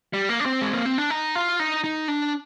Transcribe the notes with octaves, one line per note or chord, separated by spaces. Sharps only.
G3
A#3
D4
C4
G#3
A#3
C4
D4
D#4
F4
D#4
D#4
D4